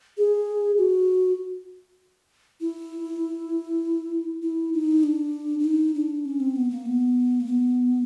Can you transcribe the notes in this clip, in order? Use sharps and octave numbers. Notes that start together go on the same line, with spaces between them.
G#4
F#4
E4
E4
D#4
D4
D4
D#4
D4
C#4
C4
B3
A#3
B3
A#3
B3